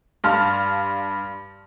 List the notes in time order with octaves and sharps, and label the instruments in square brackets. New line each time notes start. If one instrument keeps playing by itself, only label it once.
[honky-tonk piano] G2 F5 A5 C6 F6